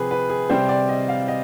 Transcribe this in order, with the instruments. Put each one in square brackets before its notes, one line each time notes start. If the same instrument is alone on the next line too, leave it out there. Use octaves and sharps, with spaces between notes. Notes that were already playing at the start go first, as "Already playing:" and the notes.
Already playing: [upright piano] C3 F3 C4 G#4 B4 C5
B4
G#4
C3 G3 C4 C5
D5
D#5
F5
D#5